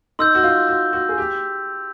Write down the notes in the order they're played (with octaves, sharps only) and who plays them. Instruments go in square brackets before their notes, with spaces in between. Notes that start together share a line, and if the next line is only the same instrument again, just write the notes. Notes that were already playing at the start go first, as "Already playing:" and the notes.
[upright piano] D#4 [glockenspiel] C6 E6 G6
[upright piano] F#4
F4
F#4
F#4
G#4
G4